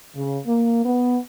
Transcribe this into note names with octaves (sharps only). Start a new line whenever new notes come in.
C#3
A#3
B3